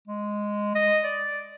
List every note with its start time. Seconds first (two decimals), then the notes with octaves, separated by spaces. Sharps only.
0.08 G#3
0.75 D#5
1.04 D5